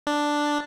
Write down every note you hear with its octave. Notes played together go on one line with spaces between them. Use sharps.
D4